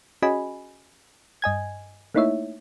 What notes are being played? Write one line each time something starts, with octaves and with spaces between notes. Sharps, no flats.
C#4 F#4 G#4 D#5 G#5 B5
G2 D#5 G#5 G#6
A3 A#3 D#4 E4 C#5 E5